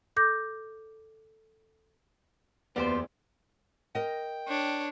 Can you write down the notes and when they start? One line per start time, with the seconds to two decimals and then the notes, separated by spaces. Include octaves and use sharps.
0.16 A4 D6 G6 A#6
2.76 F#1 E2 B3 F4 G4 C5 D5
3.95 A#4 D#5 G5
4.48 D4 C#5